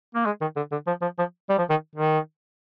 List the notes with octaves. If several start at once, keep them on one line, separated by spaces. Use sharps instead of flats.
A#3
G#3
D#3
D3
D3
F3
F3
F3
G3
F3
D#3
D#3